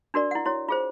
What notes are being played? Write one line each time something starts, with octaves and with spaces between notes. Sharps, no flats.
D4 F#4 A#4 D5
E4 F#5
E4 F#4 C#5
F4 G#4 C5